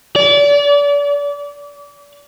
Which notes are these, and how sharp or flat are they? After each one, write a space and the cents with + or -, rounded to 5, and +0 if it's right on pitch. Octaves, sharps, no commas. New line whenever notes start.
D5 -35